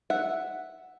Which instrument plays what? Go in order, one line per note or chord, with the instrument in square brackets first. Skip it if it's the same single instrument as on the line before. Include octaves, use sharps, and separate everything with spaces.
[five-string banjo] E5 F#5